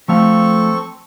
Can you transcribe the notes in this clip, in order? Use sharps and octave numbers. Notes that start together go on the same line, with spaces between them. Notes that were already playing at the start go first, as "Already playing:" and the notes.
F3 A3 C4 A4 F5 C#6